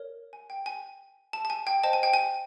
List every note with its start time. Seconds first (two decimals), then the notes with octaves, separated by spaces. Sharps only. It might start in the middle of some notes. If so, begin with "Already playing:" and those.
Already playing: A#4 C#5
0.33 G#5
0.50 G5
0.66 G#5
1.33 A5
1.45 A5
1.50 G#5
1.67 G5
1.83 C5 D#5 G5 A5
1.93 G#5
2.03 G5
2.13 G#5